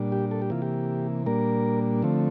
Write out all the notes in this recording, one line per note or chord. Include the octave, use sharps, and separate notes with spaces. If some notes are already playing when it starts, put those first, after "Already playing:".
Already playing: A#2 G3 D4
G4
A4
G4
C3 E3 A#3 F4
G4
A#2 G3 A#3 D4 A#4
D3 F3 A3 C4